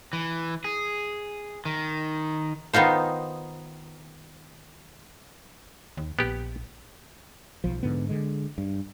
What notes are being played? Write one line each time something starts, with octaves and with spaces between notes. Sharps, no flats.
E3
G#4
D#3
D#3 B3 D#4 F4 C5
D#2
A#1 B3 G4
B1 F3
G#2 D3 B3
D3 G#3
G2